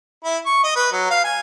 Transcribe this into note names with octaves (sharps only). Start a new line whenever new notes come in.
E4
C#6
D#5
B4
F#3
F5
G#5